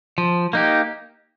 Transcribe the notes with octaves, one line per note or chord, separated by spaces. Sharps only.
F3
A#3 D#4 G4